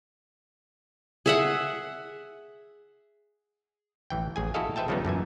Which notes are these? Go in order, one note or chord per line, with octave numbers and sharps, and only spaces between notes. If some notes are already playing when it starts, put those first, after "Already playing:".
G#4 E5 F#5
A1 E3 G5
A1 G#4 G#5
E4 F#4 G#4 A4 D#5 F5
A4 B4 C5 E5 G5 A5
C#3 F3 G3 A3 B3 D#4
F#2 A#2 E3 G#5